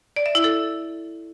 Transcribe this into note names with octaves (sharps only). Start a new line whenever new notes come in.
D5
E5
E4
A4